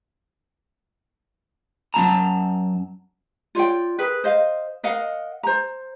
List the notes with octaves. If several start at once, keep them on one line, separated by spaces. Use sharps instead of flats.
F#2 B3 A5 A#5
F4 C#5 D5 G5
G#4 A#4 B4
C5 D#5 F5
A#4 D#5 F5 F#5
C5 A#5